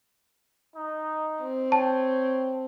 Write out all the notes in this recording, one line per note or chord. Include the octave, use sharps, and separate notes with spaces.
D#4
C4
C#5 G5 A5